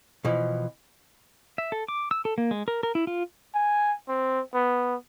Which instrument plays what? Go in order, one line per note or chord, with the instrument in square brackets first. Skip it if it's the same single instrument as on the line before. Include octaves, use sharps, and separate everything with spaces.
[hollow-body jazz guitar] B2 E3 F3
[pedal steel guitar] E5
A4
D6
E6
A4
A#3
G#3
A#4
A#4
E4
F4
[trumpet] G#5
C4
B3